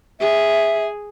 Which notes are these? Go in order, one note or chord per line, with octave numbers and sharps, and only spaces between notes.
G#4 E5